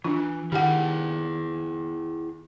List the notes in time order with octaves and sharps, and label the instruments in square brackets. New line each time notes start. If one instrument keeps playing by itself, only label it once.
[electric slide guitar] E3 [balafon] D4 F4
[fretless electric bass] D#3 [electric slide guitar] E4 G#4 G5 [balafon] G4 F#5